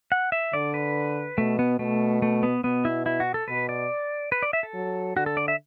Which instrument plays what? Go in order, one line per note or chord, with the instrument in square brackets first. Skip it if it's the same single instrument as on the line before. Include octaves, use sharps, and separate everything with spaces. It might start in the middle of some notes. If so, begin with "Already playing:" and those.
[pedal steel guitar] F#5
E5
[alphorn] D3 [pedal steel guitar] D5
[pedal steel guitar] B4
[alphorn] B2 [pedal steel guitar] A3
[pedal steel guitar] B3
[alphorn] B2 [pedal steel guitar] A3
[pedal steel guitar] A3
B3
[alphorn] B2 [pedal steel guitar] B3
[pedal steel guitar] E4
E4
F#4
A4
[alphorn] B2 [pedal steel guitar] B4
[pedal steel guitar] D5
B4
D5
E5
A4
[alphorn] F#3
[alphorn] D3 [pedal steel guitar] F#4
[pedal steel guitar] A4
D5
E5